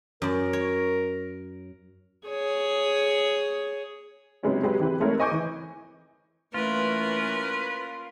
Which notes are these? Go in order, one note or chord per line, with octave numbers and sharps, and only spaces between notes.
F#2 A#4 D5
C#5
G#4 C#5
C3 F#3 G#3 B3 C#4 D#4
F#3 G#3 G4 B4
E3 C4 G4 B4
G#3 A3 C4 D#4 A#4 C#5
C5 D#5 G#5 C#6 D6 G6
E3
E3 A3 A#3 C#4 F4 A#4 B4